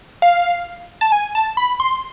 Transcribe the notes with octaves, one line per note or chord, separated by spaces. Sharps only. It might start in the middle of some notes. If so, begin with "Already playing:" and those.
F5
A5
G#5
A5
B5
C6